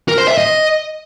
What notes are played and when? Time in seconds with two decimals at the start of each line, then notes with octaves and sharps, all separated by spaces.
0.08 A#4
0.18 C5
0.28 E5
0.38 D#5